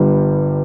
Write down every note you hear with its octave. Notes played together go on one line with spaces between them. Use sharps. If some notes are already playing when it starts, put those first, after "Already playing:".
Already playing: G1 G2 G3